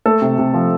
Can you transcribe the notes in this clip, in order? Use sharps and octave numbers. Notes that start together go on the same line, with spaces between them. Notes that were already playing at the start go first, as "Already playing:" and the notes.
A3 A4
C3
C3
F3